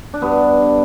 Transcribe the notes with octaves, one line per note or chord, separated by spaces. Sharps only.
D4
G2 B3
D3